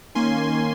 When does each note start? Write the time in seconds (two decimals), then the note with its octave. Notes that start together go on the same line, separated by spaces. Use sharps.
0.15 D#3 A#3 C#4 G#5 C6